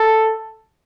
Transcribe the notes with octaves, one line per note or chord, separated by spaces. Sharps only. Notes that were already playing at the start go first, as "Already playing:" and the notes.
Already playing: A4